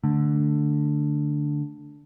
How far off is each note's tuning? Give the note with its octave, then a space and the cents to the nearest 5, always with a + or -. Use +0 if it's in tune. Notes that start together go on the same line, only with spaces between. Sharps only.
D3 +0 A3 +0